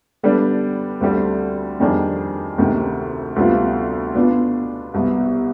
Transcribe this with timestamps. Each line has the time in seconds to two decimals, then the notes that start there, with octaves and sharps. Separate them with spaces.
0.23 D3 G3 B3 D4
1.01 D2 D3 G3 C4
1.80 F2 D#3 G3 D4 G#4
2.58 D2 C3 D#3
3.36 D2 C3 G3 B3 F4
4.15 B2 B3 D4 F4
4.94 C2 B2 B3